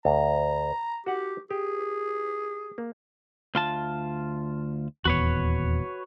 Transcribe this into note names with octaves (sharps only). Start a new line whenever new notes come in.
D2 A#5
F#4 G4 F#5
G4 G#4
A#3
D2 F4 A5
D#1 E2 F#4 B4 C#5